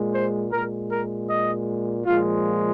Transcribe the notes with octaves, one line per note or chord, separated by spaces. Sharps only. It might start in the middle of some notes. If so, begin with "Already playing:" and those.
Already playing: A#2 G#3
C5
A#2 G#3 A#4
A#4
D#5
A#2 F3 G#3 F4